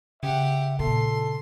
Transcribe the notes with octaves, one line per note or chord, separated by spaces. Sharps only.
C#3 G4 E5 F#5
A#2 A4 C6